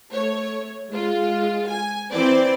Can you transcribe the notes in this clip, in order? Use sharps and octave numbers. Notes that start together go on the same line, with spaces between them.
A3 C#5
G#3 F4
G#5
E3 C4 E4 C5 D5